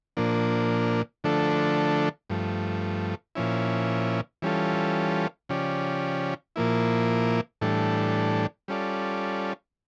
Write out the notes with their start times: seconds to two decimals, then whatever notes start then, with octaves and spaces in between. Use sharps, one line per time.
0.17 A#2 F3 A#3 D4
1.24 D3 F3 A3 D4 A4
2.30 G2 F3 A3
3.35 A#2 F3 C#4 E4
4.42 E3 G3 C#4 F4 A4
5.49 C#3 F3 C#4 G4 D5
6.56 A#2 F3 A#3 E4
7.61 A2 E3 G3 D4 A4
8.68 G3 C#4 F4 A4 D5